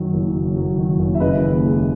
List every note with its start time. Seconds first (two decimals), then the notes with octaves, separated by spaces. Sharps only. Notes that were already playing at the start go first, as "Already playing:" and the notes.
Already playing: F#2 D#3 F#3
0.14 F#1
0.35 F#2
0.56 F#3
0.78 D#3
0.99 F#1
1.15 E5
1.20 C#3 B4 D#5
1.42 D#2
1.64 G#3